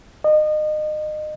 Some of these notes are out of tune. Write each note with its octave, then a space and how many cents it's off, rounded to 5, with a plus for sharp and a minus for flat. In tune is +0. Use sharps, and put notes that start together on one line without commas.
D#5 -30